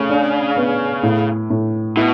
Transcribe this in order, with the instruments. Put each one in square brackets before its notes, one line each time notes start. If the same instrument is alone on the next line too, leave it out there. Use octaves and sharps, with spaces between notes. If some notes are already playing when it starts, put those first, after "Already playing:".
Already playing: [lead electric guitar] C#3 [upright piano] A3
[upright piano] D4
B3
A2
A2
[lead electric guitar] B2 [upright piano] E4